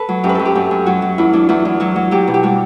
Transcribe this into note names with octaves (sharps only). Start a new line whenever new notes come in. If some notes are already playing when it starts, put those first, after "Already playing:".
Already playing: A4 B4
F#3
F#2 G4
B4
F#2 A4
G4
F#2
F#2
F#3 F#4
F#3
E2 E4
F#3 D4
E2 E4
E2
F#3 F#4
F#3
F#3 G4
B2
G4
G3 F#4